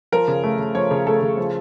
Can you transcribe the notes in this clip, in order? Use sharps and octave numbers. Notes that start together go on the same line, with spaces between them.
F3 A#4
C#3
A3
C#3
F3 C#5
C#3
A3 A4
C#3
F3